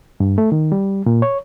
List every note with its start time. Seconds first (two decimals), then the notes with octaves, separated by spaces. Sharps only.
0.20 G2
0.38 A3
0.52 D#3
0.72 G3
1.06 A#2
1.22 C#5